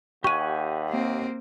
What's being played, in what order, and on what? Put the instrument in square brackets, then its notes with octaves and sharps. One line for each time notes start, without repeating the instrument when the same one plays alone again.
[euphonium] D#2 [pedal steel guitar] G4 F#5 G#5 [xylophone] C#6 D#7
[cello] A#3 C4